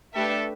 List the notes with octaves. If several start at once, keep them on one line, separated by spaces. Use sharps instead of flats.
A3 D4 G4 A4 B4 E5